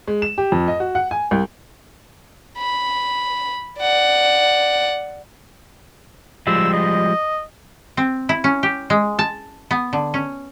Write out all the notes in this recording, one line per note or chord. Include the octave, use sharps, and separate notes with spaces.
G#3
E7
G4
F2
D#5
F#4
F#5
G#5
C2
B5
D5 F#5
F3 G3 G#3 E6
D#5
C4
E4
C#4
G4
G#3
A5
B3
D3
C#4